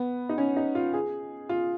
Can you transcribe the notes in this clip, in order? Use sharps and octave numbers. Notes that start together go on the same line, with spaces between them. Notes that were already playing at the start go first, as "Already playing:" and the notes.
Already playing: B3
D#4
C#4
D#4
F4
G#4
F4